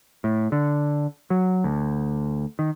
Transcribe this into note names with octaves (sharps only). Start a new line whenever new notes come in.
A2
D3
F#3
D2
D#3